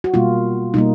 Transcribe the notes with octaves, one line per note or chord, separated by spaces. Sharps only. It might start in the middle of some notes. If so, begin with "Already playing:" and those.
F#4
B2 G3 A#3 F4
B2 G3 A#3 D#4